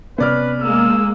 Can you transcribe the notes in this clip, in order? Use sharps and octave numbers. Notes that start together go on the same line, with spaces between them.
C3 B3 C#4 B4 D5 F6
G#3 A#3 E6